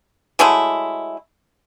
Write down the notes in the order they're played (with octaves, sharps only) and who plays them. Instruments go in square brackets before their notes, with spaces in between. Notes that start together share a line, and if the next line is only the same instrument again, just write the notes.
[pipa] F#3 G#3 A3 E4